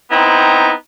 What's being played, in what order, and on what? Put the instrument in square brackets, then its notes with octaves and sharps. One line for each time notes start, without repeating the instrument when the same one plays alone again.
[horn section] B3 C4 D#4 E4 G5 A#5